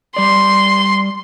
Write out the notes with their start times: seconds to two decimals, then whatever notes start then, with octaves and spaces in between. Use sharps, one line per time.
0.16 G3 D5 C6